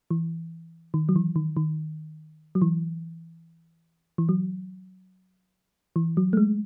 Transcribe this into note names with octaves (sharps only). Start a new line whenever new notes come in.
E3
D#3
F#3
E3
D#3
D#3
F#3
E3
E3
F#3
E3
F#3
A3
G#3